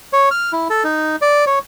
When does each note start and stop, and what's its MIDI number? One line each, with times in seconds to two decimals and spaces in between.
0.13 0.29 73
0.31 0.52 89
0.53 0.68 64
0.70 0.84 69
0.84 1.16 63
1.22 1.45 74
1.47 1.59 73